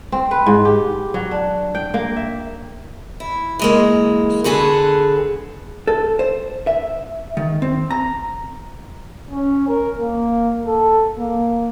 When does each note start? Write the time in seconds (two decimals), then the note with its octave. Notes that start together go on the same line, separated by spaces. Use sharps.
0.12 C4
0.31 B4
0.46 G#2
0.65 G4
1.14 F#3
1.31 D4
1.75 G5
1.94 A#3
2.16 E5
3.20 E4
3.59 E3 G#3 A#3
4.44 D3 F#4 G#4 A4 B4
5.87 A4
6.19 C5
6.67 E5
7.37 D#3
7.62 C4
7.91 A#5
9.31 C#4
9.68 A#4
9.99 A#3
10.67 A4
11.19 A#3